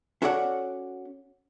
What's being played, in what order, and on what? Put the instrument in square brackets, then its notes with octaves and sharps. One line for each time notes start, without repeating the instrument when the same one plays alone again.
[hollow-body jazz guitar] C#4 F#4 A4 C#5 D5 F#5